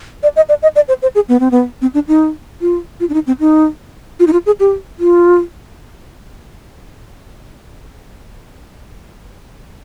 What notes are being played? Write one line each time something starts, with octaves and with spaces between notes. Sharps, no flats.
D5
D#5
D5
D#5
D5
C5
C5
G#4
B3
C4
B3
C4
D4
D#4
F4
F4
D4
D#4
C4
D#4
F4
D#4
F4
G#4
G4
F4